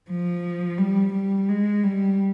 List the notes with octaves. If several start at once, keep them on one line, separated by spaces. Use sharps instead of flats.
F3
G3
G3
G#3
G3